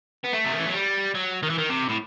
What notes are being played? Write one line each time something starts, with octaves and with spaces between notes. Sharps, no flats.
B3
A3
C3
D#3
E3
F#3
G3
F#3
D#3
E3
D#3
C3
A2